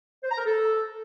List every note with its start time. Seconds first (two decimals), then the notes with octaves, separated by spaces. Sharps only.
0.23 C5
0.31 A#5
0.38 A#4
0.46 A4